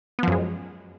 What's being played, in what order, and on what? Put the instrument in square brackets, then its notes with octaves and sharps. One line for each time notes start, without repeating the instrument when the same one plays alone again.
[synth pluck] B3
F3
F#2
G#3